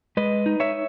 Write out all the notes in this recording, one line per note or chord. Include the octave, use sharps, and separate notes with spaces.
G#3 B4 D#5
D#4
C#5 E5